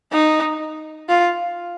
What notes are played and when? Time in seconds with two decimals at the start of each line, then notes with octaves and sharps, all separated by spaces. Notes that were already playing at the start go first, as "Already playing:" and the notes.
0.12 D#4
1.09 F4